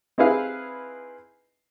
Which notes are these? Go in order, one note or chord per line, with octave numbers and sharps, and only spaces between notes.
C4 D#4 E4 G#4 B4 F5